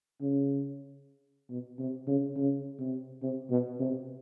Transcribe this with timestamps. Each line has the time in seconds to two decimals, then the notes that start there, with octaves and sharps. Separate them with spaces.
0.21 C#3
1.50 B2
1.79 C3
2.07 C#3
2.36 C#3
2.79 C3
3.22 C3
3.50 B2
3.79 C3